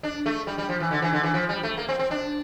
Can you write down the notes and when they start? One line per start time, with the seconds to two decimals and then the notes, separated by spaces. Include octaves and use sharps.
0.03 D4
0.26 A3
0.47 G3
0.58 G3
0.69 F3
0.80 E3
0.91 D3
1.02 E3
1.13 D3
1.23 E3
1.34 F3
1.49 G3
1.63 A3
1.77 A#3
1.89 C4
1.99 C4
2.11 D4